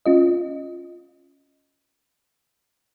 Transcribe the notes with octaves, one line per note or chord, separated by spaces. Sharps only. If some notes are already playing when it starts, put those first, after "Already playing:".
C#4 F4 D#5